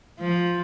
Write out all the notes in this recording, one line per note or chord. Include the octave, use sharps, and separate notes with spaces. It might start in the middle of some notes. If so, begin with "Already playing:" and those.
F3